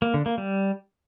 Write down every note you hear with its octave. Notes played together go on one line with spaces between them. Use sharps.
A#3
D3
A#3
G3